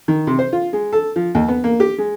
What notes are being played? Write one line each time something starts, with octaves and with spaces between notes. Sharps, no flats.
D#3
C3
C5
F4
G#3
A4
F3
D#2
B3
A#3
G4
G#3